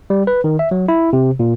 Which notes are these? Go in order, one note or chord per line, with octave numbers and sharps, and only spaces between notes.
G3
B4
D#3
E5
F#3
E4
C3
A#2